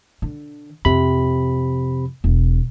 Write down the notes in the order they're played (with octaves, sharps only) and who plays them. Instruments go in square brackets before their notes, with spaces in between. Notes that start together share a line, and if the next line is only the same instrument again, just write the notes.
[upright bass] D3
[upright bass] F2 [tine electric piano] C3 B5
[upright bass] E1